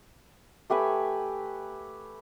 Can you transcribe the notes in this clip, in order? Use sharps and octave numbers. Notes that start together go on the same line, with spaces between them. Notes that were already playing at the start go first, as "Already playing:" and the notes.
A3 G4 B4 G#5